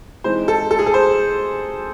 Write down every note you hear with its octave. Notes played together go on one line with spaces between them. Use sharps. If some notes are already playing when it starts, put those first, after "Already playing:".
E3 G#3 C4 D#4 C5
A4
A4
G#4
A4
C5